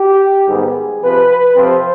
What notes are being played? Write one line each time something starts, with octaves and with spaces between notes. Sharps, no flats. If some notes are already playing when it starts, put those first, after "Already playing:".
Already playing: G4
G#2 D#3 G3 B3 G#4
C3 F3 C4 B4
F2 C3 F3 C4 C5